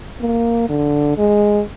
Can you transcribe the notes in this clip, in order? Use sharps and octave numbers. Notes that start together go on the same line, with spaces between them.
A#3
D3
G#3